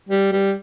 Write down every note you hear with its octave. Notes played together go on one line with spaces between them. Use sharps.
G3
G3